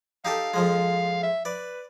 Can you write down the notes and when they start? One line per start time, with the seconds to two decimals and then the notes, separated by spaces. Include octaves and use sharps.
0.25 D#4 G4 A4 F5
0.54 F2 F3 G#3
1.23 E5
1.45 B4 D5